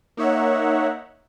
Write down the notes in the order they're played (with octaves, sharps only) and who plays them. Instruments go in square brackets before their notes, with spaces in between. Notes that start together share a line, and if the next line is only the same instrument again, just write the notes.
[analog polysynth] A#3 D#4 C#5 E5 F#5